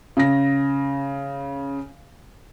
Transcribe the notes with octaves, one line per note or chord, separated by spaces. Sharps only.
C#3 A#6